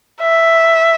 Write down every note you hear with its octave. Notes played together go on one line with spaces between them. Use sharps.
E5